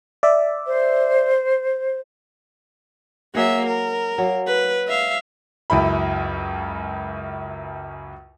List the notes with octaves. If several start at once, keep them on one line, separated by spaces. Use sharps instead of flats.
D5 E5
C5
F#3 A#3 G#4 E5 F#5
A#4
F#3 A#3
B4
E5 F5
C#2 F#2 E4 B5